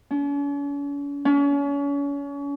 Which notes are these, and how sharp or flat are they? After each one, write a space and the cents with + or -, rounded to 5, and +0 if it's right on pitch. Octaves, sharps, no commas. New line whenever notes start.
C#4 +45
C#4 +35